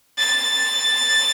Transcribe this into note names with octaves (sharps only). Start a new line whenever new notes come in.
A6